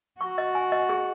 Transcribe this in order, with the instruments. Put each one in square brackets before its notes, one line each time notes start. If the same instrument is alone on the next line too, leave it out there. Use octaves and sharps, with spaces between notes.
[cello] F#4 [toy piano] C#6
[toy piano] D#5
G#5
D#5
G#4